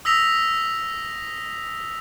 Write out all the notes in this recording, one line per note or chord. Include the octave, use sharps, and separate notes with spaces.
D#6 E6 A#6 B6 F7